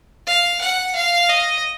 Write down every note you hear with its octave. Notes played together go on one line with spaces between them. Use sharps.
F5
F#5
F5
D#5